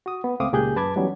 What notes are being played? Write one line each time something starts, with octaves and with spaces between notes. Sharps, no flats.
F#4 D#6
B3
C#2 A3 C4 F5 D6 D#6
C#2 A#2 G4 G#4 F#6 G6
F#2 B4 A5 B5 D6 G#6
E3 F#3 G3 B3 C#4 D#4